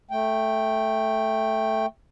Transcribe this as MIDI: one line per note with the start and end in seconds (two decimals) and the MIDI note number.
0.11 1.86 57
0.11 1.86 79